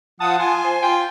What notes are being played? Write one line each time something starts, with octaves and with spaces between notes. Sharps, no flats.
F3 F#5 A5 D#6
F4 G#5
C5
F4 G5